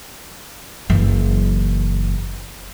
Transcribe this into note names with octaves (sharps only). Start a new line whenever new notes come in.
F#1 E3